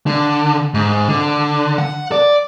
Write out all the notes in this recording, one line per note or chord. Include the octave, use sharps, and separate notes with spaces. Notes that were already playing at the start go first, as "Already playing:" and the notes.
D3
G#2
D3
F#5
D5